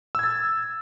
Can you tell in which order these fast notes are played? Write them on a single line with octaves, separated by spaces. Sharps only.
E6 G#6 A6